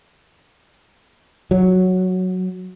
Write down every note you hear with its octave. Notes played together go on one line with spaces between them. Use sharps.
F#3